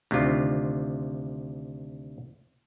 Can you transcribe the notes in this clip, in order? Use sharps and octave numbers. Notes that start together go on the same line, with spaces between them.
D2 C3 D#3 F4